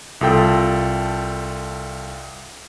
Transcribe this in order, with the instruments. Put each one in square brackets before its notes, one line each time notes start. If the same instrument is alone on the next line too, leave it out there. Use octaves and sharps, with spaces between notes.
[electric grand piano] C2 F4 A4 G5 E6